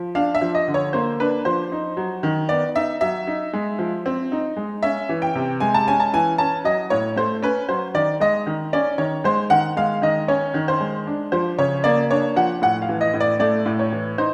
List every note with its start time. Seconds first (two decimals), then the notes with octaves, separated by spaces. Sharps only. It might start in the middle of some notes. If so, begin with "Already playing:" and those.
Already playing: F3
0.15 D4 F5
0.35 E5
0.41 F3
0.55 D#5
0.68 D3
0.74 C#5
0.93 A#3 C5
1.20 D4 B4
1.45 F3 C5
1.72 D#4
1.97 F#3
2.23 D#3
2.49 B3 D5
2.76 D#4 E5
3.01 F#3 E5
3.27 D#4
3.53 G#3
3.79 F3
4.06 C4
4.32 D#4
4.57 G#3
4.83 C#4 E5
5.09 E3
5.22 G5
5.35 C3
5.60 G#3 G#5
5.74 A5
5.88 C#4 G#5
6.00 A5
6.13 E3 G#5
6.38 C#4 A5
6.64 F#3 D#5
6.90 A2 C#5
7.16 A3 C5
7.42 C#4 B4
7.69 F#3 C5
7.94 D#3 D5
8.20 G#3 D#5
8.46 D#3
8.73 C#4 D5
8.98 D#3 C#5
9.24 G#3 C5
9.50 D#3 F#5
9.77 G#3 F5
10.02 D#3 D#5
10.28 C#4 C#5
10.54 D#3
10.68 C5
10.80 G#3
11.07 D4
11.32 F3 C5
11.59 C#3 C#5
11.84 A#3 D5
12.11 D4 C#5
12.36 F3 F#5
12.62 A2 F#5
12.82 F5
12.89 E3
13.01 D#5
13.14 A2
13.20 D5
13.40 A3 D5
13.66 A2
13.79 C#5
13.92 E3
14.18 D#4 C5